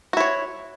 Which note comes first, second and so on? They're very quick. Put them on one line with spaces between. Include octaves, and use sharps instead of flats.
F#4 E4 C#5